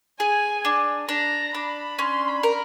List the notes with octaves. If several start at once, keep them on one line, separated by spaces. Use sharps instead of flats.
G#4 G#5
D4
D4 A#5
D4 B5
C#4 C6
B5
A#4